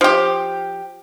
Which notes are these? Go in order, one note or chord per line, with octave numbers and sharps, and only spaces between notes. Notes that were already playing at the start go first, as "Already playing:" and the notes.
F3 G4